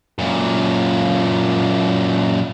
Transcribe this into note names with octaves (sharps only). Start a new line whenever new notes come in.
F#2 A#2